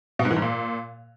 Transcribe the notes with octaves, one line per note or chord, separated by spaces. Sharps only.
B2
G#2
E3
G#2
A#2